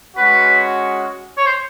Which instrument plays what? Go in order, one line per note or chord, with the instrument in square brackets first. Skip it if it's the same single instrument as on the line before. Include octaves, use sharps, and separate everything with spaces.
[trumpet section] G#3 C#4 F#4 [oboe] B4
[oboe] C#5
C5